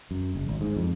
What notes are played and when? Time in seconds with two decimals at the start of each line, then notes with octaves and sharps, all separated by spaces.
0.11 F#2
0.35 F#1
0.48 G#1
0.61 G#2
0.76 F2